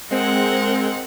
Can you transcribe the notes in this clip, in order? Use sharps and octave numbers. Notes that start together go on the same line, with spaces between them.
G#3 C4 A#4 F#5